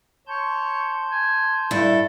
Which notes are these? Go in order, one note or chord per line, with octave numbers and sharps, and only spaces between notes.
C#5 A5 C6 G6
G#5
G2 E4 A4 E5